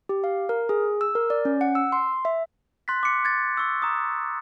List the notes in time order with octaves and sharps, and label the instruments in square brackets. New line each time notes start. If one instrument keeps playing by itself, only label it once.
[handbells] G4
F5
A#4
G#4
E6
A#4
D5
C#4
F#5
E6
C6
E5
[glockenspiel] C6 F#6 A6 B6
D6 C#7
G#6 A6
C#6 E6
A#5 D#6